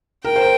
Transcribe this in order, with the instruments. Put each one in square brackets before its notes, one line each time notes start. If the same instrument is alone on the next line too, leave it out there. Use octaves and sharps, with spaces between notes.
[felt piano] A#4 [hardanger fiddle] G5
[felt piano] C5